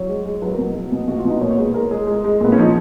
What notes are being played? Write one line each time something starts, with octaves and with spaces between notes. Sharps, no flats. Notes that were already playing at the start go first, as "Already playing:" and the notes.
Already playing: F#3 C#5
G#3
G#3
F#3 B4
A#4
B2
F#3
B2
B2 F#4
F4
B2 D#4
A#2 C#5
C#5
G#3 B4
G#4
G#3 A#4
G#3 G#4
G#3
G#3
A#2 B3
C#4
F3 D#4